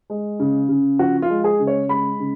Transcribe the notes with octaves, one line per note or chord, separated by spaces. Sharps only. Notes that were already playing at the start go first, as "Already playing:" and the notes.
G#3
C#3
C#3
F3 F#4
F4
G#3
G#4
C#3
C#5
G#3 B5
C#3